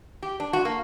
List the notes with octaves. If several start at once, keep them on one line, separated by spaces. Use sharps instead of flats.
G4
D4
F#4
A#3